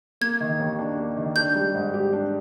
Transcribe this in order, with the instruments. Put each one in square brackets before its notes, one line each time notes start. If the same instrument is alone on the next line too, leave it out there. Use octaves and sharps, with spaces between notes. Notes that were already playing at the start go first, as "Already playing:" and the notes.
[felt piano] A#3 [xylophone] G#6
[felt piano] D#3
D#2
D4
A#3
D#3
[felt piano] D4 [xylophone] G6
[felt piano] G3
G#2
G4
D4